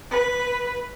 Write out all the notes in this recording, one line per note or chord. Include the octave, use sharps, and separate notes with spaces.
B4